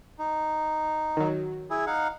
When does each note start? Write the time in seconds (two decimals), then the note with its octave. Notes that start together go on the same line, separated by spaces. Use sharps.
0.19 D#4
1.17 D#3 F#3
1.70 E4 G#4
1.87 D#4 F5 F#5